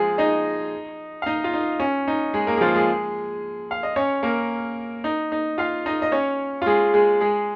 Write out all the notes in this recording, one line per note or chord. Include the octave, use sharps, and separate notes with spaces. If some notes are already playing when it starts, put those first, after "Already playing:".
Already playing: F3 G#3 F4 G#4
D#4 D#5
F5
D#4 D#5
F4
D#4
C#4
D#4
G#3 G#4
A#3 A#4
G#4
F3 F4
G#3 G#4
F5
D#5
C#4 C#5
A#3 A#4
D#4
D#4
F4 F5
D#4 D#5
D#5
C#4 C#5
F4
G#3 G#4
G#3 G#4
G#3 G#4